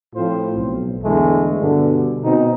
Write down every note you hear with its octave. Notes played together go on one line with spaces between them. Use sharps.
A2 F3 C4 F4 C5
B1
E2 D3 E3 G#3 A3
G2 B2 D3
B2 C4 D#4